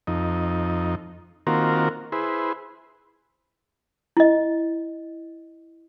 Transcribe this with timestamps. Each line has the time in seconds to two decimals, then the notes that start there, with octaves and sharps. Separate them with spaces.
0.07 F2 D#4
1.47 D#3 A#3 C4 F4 F#4 A#4
2.12 E4 G#4 B4 C5
4.17 E4 D#5